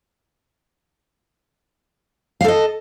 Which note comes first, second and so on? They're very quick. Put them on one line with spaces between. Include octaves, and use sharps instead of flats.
F5 A4 D#5